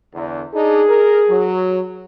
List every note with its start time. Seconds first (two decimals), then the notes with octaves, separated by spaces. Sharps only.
0.14 E2 D3
0.54 D4 D#4 G#4
0.89 A#4
1.28 F#3